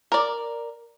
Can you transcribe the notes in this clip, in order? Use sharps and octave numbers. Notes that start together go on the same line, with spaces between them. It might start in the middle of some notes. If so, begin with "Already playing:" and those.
A#4 D5